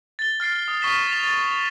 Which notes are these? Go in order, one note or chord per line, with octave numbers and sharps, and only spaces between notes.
A6 G7
F6 A6 C7 D7
D#6
C#6 D#6 F6 B6 E7 G7
A6 F7
A6